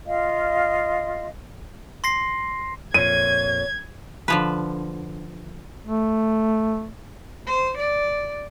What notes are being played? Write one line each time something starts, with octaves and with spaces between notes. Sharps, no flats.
F4 D#5 F5
C6 A#6 C7
F2 A#2 C#5 G#6 D#7
D3 F3 B4
A3
C5
D5